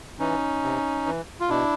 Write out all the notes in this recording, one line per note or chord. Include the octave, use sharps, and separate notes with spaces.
E3 C#4 D#4
C3
E3
F4
B2 D4 E4